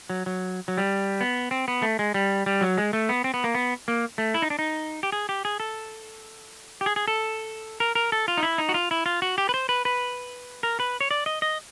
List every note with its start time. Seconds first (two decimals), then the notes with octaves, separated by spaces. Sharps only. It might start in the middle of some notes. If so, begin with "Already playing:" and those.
0.10 F#3
0.26 F#3
0.68 F#3
0.78 G3
1.21 B3
1.51 C4
1.68 B3
1.82 A3
1.99 G#3
2.14 G3
2.46 G3
2.61 F#3
2.78 G#3
2.93 A3
3.09 B3
3.24 C4
3.34 B3
3.44 A#3
3.55 B3
3.88 A#3
4.18 A3
4.34 E4
4.42 D#4
4.50 D4
4.59 D#4
5.03 G4
5.12 G#4
5.29 G4
5.45 G#4
5.60 A4
6.81 G4
6.86 G#4
6.96 G#4
7.08 A4
7.80 A#4
7.95 A#4
8.12 A4
8.28 F4
8.37 D#4
8.43 E4
8.58 D#4
8.69 F#4
8.74 F4
8.91 E4
9.06 F4
9.22 F#4
9.38 G4
9.49 B4
9.54 C5
9.69 B4
9.85 B4
10.63 A#4
10.80 B4
11.01 C#5
11.11 D5
11.26 D#5
11.42 D#5